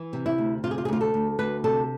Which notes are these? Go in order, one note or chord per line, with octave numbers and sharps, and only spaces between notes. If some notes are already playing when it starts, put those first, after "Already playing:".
Already playing: E3
C3
E4
D2
C3 F4
G#4
F4
G#4
D2 F4
A4
D2
D2 B4
C3 A4